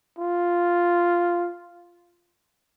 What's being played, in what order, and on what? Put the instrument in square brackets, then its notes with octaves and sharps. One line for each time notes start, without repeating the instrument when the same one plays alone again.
[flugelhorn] F4